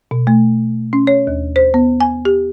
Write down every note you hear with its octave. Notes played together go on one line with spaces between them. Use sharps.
B2
A3
C#4
C#5
D#2
C5
B3
G#5
G4